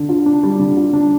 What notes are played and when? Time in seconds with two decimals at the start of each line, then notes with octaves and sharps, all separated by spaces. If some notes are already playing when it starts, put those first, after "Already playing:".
Already playing: D3
0.09 F4
0.26 D4
0.43 G3
0.59 D3
0.77 F4
0.93 D4